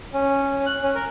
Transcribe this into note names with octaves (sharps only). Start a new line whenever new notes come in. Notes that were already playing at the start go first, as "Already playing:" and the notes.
C#4
F#6
C#4
A#4